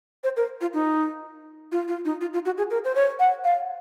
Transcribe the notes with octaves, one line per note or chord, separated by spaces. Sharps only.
C5
A#4
F4
D#4
F4
F4
D#4
F4
F4
F#4
G#4
A#4
C5
C#5
F#5
F5